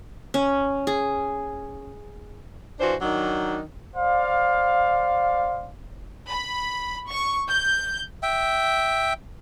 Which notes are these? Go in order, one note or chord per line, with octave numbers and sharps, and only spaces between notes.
C#4
G#4
E3 D4 F4 F#4 C5
D#3 F#3 D4 D#4
C5 D5 F5
B5
C#6
G6
E5 G5